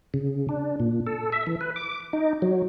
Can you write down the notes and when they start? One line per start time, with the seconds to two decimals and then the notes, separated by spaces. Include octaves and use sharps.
0.14 C#3
0.49 D4
0.80 A#2
1.07 A4
1.32 E5
1.47 E3
1.61 B4
1.76 D6
2.13 D#4
2.42 F#3